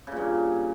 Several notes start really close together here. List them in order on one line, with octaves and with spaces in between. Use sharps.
C#3 A#2 G2